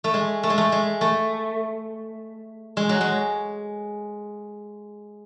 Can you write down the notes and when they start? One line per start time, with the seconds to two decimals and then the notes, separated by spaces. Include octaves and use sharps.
0.04 A3
0.14 G#3
0.43 A3
0.50 G#3
0.58 A3
0.72 G#3
1.01 A3
2.77 G#3
2.89 F#3
3.01 G#3